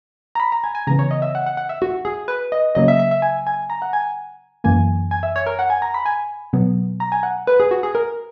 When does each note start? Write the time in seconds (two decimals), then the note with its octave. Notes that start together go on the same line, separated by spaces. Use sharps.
0.35 A#5
0.40 B5
0.52 A#5
0.64 G#5
0.75 G#5
0.87 C#3 E3 B3 A#5
0.99 C#5
1.11 D#5
1.22 E5
1.35 F#5
1.46 F#5
1.57 F#5
1.69 E5
1.82 F#4
2.05 G#4
2.28 B4
2.52 D#5
2.75 C#3 F#3 A#3 D#5
2.88 E5
3.00 E5
3.11 E5
3.22 G#5
3.47 G#5
3.70 A#5
3.82 F#5
3.93 G#5
4.64 F#2 E3 A#3 G#5
5.11 G#5
5.23 E5
5.36 C#5
5.46 A#4
5.59 F#5
5.70 G#5
5.82 A#5
5.94 B5
6.06 G#5
6.53 B2 F#3 B3
7.00 A#5
7.12 G#5
7.23 F#5
7.47 B4
7.60 G#4
7.71 F#4
7.83 G#4
7.95 A#4